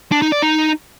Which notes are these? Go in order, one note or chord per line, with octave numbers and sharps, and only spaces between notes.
D4
D#4
D5
D#4